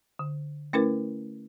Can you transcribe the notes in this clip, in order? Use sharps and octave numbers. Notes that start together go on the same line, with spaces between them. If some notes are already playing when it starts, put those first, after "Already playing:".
D3
A3 C#4 E4 A#4 B4